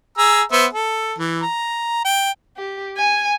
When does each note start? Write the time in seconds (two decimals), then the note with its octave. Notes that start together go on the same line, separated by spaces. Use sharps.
0.18 G#4 A#5 E6
0.52 B3 C5 E5
0.73 A4
1.18 E3
1.43 A#5
2.05 G5
2.57 G4
2.97 G#5